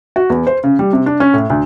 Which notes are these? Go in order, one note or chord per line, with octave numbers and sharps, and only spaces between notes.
F#4
E2
C5
C#3
G3
C3
D4
C#4
A2
D2